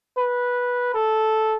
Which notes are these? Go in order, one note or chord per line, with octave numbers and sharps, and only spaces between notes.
B4
A4